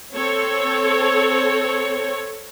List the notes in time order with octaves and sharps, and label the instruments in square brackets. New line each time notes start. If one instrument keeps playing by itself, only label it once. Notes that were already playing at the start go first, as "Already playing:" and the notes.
[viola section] C4 A4 C#5